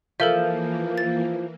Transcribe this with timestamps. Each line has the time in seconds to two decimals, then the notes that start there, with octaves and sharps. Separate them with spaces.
0.20 E3 F3 A#3 A4 A#4 E5
0.98 A6